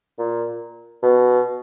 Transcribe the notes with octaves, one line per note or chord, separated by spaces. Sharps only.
A#2
B2